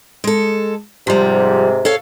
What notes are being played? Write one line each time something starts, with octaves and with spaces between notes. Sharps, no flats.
G#3 A4
G#2 C3 F3 G3
A4 C#5 F5